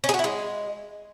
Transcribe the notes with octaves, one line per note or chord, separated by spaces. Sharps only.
C#4
G#4
F#4
E4
G#3